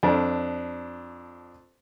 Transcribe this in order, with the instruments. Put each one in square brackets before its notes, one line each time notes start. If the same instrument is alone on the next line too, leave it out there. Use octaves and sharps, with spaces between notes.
[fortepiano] F2 D4 D5